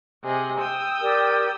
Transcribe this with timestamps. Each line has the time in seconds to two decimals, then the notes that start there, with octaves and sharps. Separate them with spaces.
0.23 C3 G#4 D#5
0.59 G5 D#6 E6
1.01 G4 A#4 D5